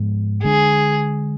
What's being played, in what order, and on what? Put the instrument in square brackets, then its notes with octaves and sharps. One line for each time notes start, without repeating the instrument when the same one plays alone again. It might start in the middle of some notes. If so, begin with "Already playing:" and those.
Already playing: [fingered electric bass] G#2 F3 G#3 B3
[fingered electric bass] D3 G#3 D4 [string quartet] G#4